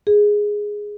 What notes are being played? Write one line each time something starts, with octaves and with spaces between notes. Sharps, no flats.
G#4